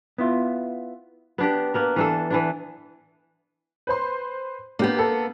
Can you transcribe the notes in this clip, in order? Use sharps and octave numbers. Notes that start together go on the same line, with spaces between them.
B3 E4 F4
B3 D4 G4
A#3 B3 A#4
E3 D4 A4
E3 B3 D4
B4 C5 C6
A#3 B3 D4 G4
A4